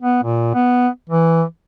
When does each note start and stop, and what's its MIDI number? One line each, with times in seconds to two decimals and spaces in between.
0.01 0.20 59
0.23 0.51 46
0.54 0.88 59
1.09 1.43 52